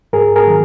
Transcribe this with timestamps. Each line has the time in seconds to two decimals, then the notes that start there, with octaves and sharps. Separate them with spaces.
0.13 G#2 G#4 A#4
0.36 G#4 A#4
0.47 D#3 F#3